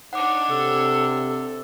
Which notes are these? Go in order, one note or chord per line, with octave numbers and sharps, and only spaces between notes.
D4 D#4 C#5 F#5 D6
C3 A4
A4